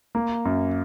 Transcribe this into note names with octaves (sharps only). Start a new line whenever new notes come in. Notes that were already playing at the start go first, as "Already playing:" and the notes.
A#3
F#2